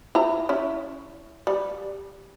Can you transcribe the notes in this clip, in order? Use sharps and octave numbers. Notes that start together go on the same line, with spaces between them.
E4 A#5
C#4 E4
G3